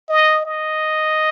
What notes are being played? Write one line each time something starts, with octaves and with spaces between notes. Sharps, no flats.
D#5
D#5